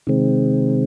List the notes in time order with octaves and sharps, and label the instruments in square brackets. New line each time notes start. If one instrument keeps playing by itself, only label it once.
[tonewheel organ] C3 D#3 G#3 C4